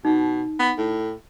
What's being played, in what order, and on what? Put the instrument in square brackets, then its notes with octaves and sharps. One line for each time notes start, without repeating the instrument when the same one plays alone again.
[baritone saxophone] B2 [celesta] D#4
[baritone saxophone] B3
A2